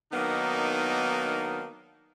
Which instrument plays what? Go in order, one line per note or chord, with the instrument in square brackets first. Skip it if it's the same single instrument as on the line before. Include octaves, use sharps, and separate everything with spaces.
[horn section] D#3 F#3 A#3 B3 D4 D#4